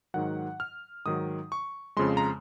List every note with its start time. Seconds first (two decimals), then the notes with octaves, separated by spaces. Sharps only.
0.14 G#2 D#3 F#3 F#5
0.60 F6
1.06 G#2 D#3 F#3 D#6
1.52 C#6
1.96 F2 C#3 F3 G#3 C6
2.17 A#5